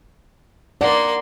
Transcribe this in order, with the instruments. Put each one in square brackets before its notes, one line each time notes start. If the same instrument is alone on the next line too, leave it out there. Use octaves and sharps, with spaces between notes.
[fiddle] A#3 C6 [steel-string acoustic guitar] D#4 F#5 [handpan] D5